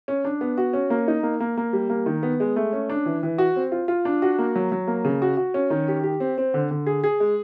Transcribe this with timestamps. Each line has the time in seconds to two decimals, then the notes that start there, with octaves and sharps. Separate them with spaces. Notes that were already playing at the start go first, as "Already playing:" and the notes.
0.08 C#4
0.25 D4
0.41 B3
0.58 F#4
0.73 C#4
0.90 A#3
1.08 D#4
1.23 A#3
1.40 A#3
1.57 A#3
1.73 G3
1.90 A#3
2.06 D#3
2.23 B3
2.40 G#3
2.56 A3
2.73 C#4
2.90 D4
3.06 E3
3.23 E3
3.38 F#4
3.56 C4
3.72 F4
3.88 F4
4.05 D4
4.22 F#4
4.39 A#3
4.56 F#3
4.72 F#3
4.87 A#3
5.05 C#3
5.22 F#4
5.37 F#4
5.54 C#4
5.70 D#3
5.88 G4
6.03 G4
6.20 C4
6.38 C4
6.54 D3
6.71 D3
6.86 G#4
7.04 G#4
7.20 G#3